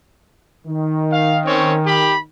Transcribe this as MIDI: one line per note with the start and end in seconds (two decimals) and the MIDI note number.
0.65 2.28 51
1.11 1.38 77
1.45 1.75 60
1.45 1.75 61
1.45 1.75 73
1.86 2.15 67
1.86 2.15 83